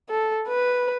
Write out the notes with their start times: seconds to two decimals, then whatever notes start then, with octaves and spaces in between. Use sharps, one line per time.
0.10 A4
0.48 B4